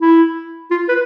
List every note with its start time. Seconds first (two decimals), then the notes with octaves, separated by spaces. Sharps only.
0.01 E4
0.71 F4
0.89 B4